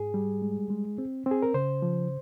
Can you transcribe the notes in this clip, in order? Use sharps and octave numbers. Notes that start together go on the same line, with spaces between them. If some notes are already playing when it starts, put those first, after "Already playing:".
Already playing: G#2 G#4
G3
G#3
G#3
C4
C4 G#4
A#4
C#3 C5
F3